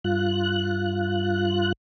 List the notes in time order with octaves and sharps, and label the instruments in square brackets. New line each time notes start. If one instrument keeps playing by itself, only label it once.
[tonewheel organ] G2 F4 F#6